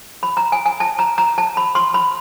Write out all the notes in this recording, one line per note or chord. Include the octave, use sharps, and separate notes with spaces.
B5
A#5
G#5
G#5
A5
A#5
A#5
A5
B5
C6
B5